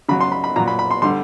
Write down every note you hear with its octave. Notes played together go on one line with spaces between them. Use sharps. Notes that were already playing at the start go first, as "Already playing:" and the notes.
C#3 F#3 B5
C6
B5
B5
A#2 F#3 A#5
B5
B5
C6
D3 G3 C6